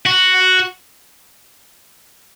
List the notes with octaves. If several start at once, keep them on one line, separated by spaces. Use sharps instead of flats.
F#4